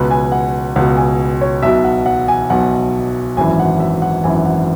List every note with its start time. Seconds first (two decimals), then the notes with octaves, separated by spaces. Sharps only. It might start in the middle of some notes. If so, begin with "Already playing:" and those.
Already playing: C#2 B2 B4
0.11 G#5
0.32 F#5
0.76 C#2 B2 F#5
0.97 G#5
1.41 C#5
1.62 B1 B2 E5
1.84 F#5
2.06 F#5
2.28 G#5
2.50 B1 B2 F#5
3.37 G#1 F#2 E3 G#5
3.59 F#5
3.80 E5
4.02 F#5
4.24 G#1 F#2 E3 G#5
4.45 F#5